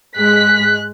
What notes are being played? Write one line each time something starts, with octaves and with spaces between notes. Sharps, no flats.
G#2 G#3 F#6 B6